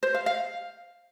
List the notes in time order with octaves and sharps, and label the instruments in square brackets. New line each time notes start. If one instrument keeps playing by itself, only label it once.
[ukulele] C5
F5
F5